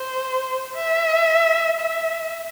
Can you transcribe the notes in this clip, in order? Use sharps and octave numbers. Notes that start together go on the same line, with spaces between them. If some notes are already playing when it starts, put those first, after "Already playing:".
Already playing: C5
E5
E5